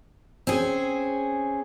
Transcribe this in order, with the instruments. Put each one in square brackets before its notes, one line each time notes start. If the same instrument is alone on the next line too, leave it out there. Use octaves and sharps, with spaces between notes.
[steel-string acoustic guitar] C4 C#4 G#4